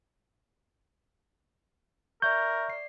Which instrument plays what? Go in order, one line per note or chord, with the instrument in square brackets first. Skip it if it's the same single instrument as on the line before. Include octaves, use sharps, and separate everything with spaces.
[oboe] A#4 [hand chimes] D5 E5 C#6 [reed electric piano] G6
[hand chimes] D5 C7